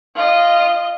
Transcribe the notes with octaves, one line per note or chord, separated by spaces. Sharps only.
F4 D#5